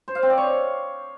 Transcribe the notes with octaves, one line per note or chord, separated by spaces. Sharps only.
C5
F5
C4
D5
C#5